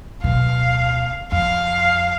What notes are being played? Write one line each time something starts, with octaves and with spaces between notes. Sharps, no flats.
D1 B2 F5
F2 F5